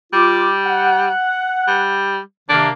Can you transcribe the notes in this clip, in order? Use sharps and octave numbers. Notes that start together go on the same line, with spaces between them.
G3 F4 D6
F#5
G3
C3 D#3 A#3 D4